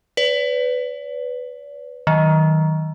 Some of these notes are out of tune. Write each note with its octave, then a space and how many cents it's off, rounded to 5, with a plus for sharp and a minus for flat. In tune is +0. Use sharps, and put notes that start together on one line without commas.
B4 +15 D5 -40
D#3 +15 F#3 +10